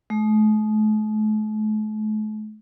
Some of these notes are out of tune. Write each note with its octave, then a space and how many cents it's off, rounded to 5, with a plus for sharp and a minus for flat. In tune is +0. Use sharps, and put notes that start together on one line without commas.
A3 -45